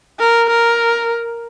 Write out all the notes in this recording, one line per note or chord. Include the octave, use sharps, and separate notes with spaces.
A#4
A#4